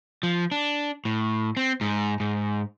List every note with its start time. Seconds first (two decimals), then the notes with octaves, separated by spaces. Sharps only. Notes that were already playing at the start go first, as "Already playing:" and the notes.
0.23 F3
0.51 D4
1.05 A2
1.57 C4
1.81 G#2
2.20 G#2